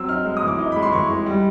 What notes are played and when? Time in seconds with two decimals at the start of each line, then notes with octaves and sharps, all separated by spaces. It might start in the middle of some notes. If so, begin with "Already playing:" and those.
Already playing: F#3 C4 E6
0.09 D#4 F6
0.25 G#3
0.37 D#6
0.42 E3
0.48 D6
0.58 D#4
0.72 G#3 B5
0.82 C6
0.92 E3 C#6
1.09 G#3
1.26 G3